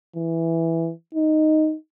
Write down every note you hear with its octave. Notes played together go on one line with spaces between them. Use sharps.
E3
D#4